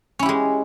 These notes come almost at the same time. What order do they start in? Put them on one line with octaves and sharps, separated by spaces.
C#4 E4 G4 G#3